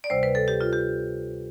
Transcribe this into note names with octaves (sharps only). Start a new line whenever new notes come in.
D5
D2 C3 G3 C5
B4
A4
G4
F4
G4